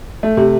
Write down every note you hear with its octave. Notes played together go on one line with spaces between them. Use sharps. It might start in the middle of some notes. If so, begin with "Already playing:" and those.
A3
C3